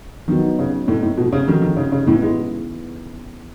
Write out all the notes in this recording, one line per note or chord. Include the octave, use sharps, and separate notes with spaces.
D#3 F#3 B3 D#4 F#4
C#3
A2 A3 D#4 A4
A2
B2
C#3
D#3 G#3 D#4 F#4 A4
D#3
C#3
C#3
A2 C#3 E3 B3 E4
G#3